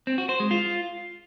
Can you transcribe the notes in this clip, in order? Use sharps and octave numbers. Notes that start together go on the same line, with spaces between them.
C4
F#4
C5
G#3
F4